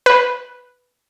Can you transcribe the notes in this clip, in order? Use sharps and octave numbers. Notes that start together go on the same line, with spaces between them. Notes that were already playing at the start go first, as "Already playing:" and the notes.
B4